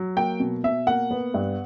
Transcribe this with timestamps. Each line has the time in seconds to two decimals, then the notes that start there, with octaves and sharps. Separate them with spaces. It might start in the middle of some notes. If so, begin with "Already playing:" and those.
Already playing: F#3
0.17 A#3 G5
0.40 B2
0.64 B2 E5
0.87 A#3 F#5
1.11 B3
1.34 G2